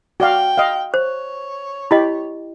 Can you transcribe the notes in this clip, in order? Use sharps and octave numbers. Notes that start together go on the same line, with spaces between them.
F#4 D5 F5 G5
D#5 F5
C5 C#5
E4 G4 D#5 B5